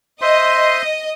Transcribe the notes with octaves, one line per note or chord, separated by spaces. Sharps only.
C5 D#5 E5 C6